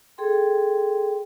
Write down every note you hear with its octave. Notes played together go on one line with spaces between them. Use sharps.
G#4 A4 G5 C6